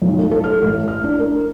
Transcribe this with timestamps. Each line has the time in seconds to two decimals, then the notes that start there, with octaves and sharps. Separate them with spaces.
0.02 B1
0.19 A3
0.31 A4
0.44 F6
0.62 A1
0.88 F6
1.04 D4
1.19 A#4